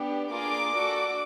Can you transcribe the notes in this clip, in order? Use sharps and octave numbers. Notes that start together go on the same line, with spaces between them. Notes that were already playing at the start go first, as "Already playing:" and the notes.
Already playing: B3 D4 G4
A#3 D4 F4 G#4 D6
D4 F#4 A4